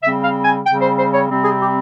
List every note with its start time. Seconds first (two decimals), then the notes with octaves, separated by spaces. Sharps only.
0.02 C#3 G3 C4 E5
0.23 F5
0.44 G#5
0.65 C#3 G3 C4 G5
0.80 C5
0.97 C5
1.12 C#5
1.28 C3 G3 C4
1.44 G#4
1.59 G4